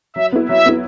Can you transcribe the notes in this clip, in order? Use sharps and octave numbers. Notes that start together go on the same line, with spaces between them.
F#3 E5
B3 E4
F#3 E5
B3 E4